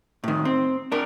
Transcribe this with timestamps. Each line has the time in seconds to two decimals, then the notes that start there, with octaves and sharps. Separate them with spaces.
0.24 A2 D#3
0.45 C4
0.92 D4 A#4